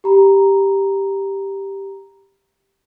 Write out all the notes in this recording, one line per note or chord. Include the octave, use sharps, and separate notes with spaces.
G4 A#5 B5